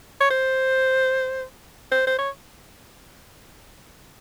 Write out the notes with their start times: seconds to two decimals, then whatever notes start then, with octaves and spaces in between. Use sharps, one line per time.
0.21 C#5
0.30 C5
1.91 C5
2.07 C5
2.18 C#5